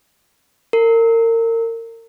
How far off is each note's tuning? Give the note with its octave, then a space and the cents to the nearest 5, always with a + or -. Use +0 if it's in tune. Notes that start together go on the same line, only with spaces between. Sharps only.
A#4 -30